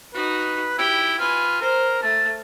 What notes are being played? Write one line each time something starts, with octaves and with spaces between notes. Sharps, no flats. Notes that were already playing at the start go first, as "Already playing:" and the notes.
D#4 F#4 B4
E4 G4 G5
F4 B4 G#5
A#4 C5
A3 A5